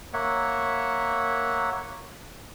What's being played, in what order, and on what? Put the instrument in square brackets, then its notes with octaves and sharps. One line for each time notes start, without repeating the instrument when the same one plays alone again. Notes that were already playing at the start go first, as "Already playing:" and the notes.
[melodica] A#3 C#5 E5 F#5